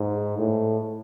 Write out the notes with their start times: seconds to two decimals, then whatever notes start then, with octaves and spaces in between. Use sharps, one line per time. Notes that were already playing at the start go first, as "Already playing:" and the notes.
Already playing: G#2
0.38 A2